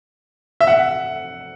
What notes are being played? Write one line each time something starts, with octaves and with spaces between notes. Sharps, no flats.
E5
F#5